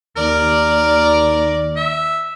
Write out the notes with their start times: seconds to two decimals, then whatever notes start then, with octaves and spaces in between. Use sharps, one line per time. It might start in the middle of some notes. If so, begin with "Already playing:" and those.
0.17 D#2 A#4 D5
1.76 E5